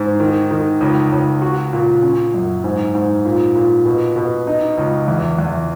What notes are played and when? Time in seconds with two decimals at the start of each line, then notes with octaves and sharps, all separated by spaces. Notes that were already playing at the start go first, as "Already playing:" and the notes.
Already playing: G#2
0.20 D#3
0.51 D#3
0.81 C#2
1.12 C#2
1.42 F#4
1.73 A#2
2.03 C#4
2.34 F#2
2.64 G#2
2.95 G#2
3.25 A#2
3.55 A#2
3.85 B2
4.16 B2
4.47 D#4
4.77 C#2
5.08 E2
5.38 E2